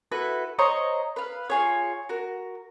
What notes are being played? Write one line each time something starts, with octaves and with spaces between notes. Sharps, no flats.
E4 F#4 A4 B4
C5 C#5 D#5 A#5
B4 F5
F4 G#4 C#5
F#4 A#4